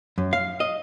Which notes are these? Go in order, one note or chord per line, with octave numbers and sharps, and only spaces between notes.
F#2
F5
D#5